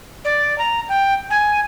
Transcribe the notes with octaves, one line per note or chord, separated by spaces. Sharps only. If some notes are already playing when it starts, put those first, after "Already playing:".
D5
A#5
G5
G#5